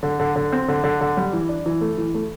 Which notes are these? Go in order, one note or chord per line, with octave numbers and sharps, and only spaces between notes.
D3
D3
D3
C4
D3
D3
D3
G3
E3
D4
E3
A3
E3
A3